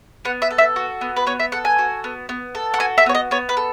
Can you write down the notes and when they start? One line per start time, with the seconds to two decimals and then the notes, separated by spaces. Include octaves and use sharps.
0.25 B3 F#5
0.42 E5
0.51 A4
0.58 E5
0.76 F#4
1.01 B3
1.16 B4
1.26 B3 C#5
1.40 E5
1.52 A4 F#5
1.65 G#5
1.79 F#4
2.04 B3
2.29 B3
2.55 A4
2.74 F#5
2.80 F#4 G#5
2.98 E5
3.06 B3 C#5
3.15 D#5
3.31 B3 C#5
3.49 B4
3.57 A4